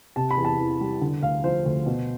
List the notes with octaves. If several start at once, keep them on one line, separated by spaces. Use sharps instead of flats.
C3 A5
B5
E2
A5
E3
G3
D3
D2 F5
F3 C5
D2
B2